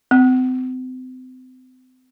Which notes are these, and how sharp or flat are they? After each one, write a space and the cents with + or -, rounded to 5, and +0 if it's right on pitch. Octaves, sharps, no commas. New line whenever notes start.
C4 -35